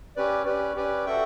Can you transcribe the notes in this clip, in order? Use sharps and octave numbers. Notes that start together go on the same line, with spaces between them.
C#4 G4 B4 D5
C#4 G4 B4 D5
C#4 G4 B4 D5
F#4 A4 E5 G5